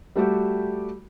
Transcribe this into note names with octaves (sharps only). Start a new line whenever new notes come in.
G3 A3 F#4 G4